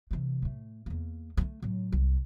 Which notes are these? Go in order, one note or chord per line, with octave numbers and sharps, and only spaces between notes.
C3 E3
A2 A3
E2 A#3
G#3 A3
A2 F#3
C2